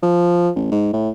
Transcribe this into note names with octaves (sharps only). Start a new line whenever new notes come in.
F3
A1
G#2
A2